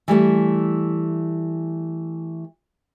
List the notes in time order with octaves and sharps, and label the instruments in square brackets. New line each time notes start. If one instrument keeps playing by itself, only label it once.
[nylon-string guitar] E3 G3 A3